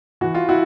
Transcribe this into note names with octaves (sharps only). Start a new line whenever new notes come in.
E3 F#4
F4
E4 F#4